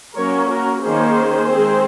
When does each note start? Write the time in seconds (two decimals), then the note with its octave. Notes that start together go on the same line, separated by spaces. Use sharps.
0.16 F#3 A#3 C#4 A#4 C#5
0.49 F#4 A#4
0.82 D#3 A#3 C#4 G#4 C5
1.50 D#3 G#3 C4